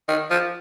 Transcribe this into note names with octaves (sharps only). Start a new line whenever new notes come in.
D#3
F3